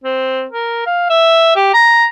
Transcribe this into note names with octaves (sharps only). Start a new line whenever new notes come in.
C4
A#4
F5
E5
G4
A#5